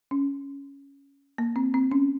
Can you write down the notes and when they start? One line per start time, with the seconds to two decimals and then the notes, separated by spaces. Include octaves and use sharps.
0.11 C#4
1.38 A#3
1.56 C4
1.74 C4
1.92 C#4